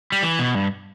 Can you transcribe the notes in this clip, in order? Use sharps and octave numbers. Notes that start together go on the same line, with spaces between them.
G3
E3
B2
G2